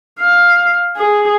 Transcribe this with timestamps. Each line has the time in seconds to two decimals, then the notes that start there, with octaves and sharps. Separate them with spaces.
0.20 F5
0.97 G#4